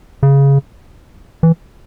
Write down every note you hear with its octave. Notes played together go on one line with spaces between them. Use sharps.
C#3
E3